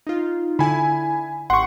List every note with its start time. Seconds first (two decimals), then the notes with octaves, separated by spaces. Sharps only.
0.07 D#4 F4
0.59 D3 E4 G#5 B5
1.50 G#1 G4 F#5 C6 C#6